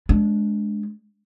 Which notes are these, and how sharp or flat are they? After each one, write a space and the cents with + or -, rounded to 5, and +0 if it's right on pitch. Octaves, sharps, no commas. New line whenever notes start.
G#3 +15 D4 -20